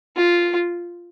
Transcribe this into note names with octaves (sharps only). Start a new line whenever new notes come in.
F4